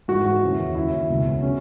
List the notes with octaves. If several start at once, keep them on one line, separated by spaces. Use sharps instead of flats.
G#2 E3 F#4
D#2 C#3 E3
D#2 C#3 F#3 E4
C#2 B2 F#3
C#3 F#3 C#4